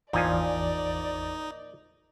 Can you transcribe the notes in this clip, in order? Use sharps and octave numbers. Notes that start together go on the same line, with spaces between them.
G#1 E2 A#2 E3 F3 D#4 D5 G#5